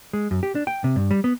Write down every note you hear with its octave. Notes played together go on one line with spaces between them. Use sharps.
G#3
F#2
G4
D4
G5
C3
G2
G3
B3